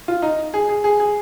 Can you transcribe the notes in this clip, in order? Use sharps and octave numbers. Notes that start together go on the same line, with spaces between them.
F4
D#4
G#4
G#4
G#4
G#4